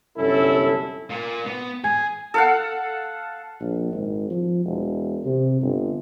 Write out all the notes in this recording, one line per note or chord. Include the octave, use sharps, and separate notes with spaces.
G1 C2 F#2 C#4 E4 A4
A#2 A#3
B3
G#4 G#5 G#6
A4 F5 F#5
A#1
G#1
F3
E1
C3
G1